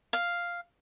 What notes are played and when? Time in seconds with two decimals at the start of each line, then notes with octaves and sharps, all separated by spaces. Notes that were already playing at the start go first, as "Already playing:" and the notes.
0.13 F5